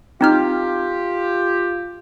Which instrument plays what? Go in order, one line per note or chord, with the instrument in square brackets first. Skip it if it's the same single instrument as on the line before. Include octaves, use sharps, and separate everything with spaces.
[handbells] C4 D#4 F6 [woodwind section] F4 G4